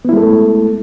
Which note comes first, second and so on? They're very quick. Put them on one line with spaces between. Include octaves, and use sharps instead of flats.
B3 E4 G#3 A4 A3